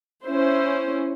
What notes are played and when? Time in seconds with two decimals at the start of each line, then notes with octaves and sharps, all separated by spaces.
0.23 C#4 E4 C5